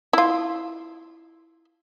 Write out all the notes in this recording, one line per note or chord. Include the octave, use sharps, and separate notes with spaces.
E4 F4